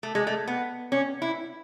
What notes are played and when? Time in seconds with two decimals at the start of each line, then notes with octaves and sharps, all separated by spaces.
0.03 A3
0.15 G#3
0.27 A3
0.47 B3
0.92 C#4
1.22 E4